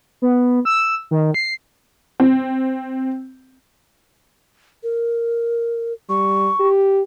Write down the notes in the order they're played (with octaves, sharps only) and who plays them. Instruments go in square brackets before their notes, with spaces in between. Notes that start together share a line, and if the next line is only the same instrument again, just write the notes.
[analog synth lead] B3
E6
D#3
C7
[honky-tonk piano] C4
[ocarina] A#4
[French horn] G3 [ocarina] C#6
[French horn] G4